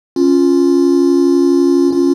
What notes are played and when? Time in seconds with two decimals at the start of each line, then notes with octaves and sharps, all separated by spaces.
0.16 C#4 F4
1.93 C#4 F4